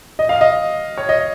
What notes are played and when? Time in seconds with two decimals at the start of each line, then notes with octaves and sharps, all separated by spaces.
0.19 D#5
0.29 F5
0.41 D#5
0.98 C#5
1.09 D#5